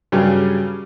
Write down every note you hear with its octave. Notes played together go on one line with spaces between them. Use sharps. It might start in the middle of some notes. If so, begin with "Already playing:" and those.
G2 C#3 F#3 G3